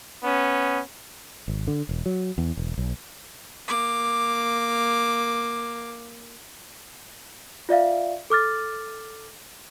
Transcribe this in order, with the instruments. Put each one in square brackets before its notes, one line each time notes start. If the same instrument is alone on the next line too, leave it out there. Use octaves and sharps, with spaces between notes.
[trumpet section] B3 C#4
[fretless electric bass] G#1
D3
E1
F#3
E2
E1
B1
[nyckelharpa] A#3 D6
[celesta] F4 D5 E5 F5
A4 D6 F6 A6